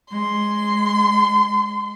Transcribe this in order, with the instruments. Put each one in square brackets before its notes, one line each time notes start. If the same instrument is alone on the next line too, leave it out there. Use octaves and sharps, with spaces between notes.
[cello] G#3 [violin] C6